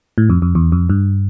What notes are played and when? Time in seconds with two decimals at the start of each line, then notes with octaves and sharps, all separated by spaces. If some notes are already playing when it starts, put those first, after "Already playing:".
0.18 A2
0.30 F2
0.42 F2
0.55 E2
0.72 F2
0.90 G2